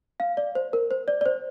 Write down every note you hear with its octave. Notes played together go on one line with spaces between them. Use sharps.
F5
D5
C5
A#4
C5
D5
D5
C5